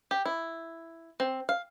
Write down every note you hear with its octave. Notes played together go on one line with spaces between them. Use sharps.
G4
E4
C4
F5